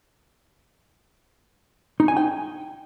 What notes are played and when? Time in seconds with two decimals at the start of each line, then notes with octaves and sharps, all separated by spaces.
2.00 D#4
2.08 G#5
2.17 G5